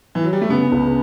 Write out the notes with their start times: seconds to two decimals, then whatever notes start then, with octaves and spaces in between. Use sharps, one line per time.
0.15 E3
0.24 F#3
0.33 G3
0.41 A3
0.50 C#3 B3
0.72 C#2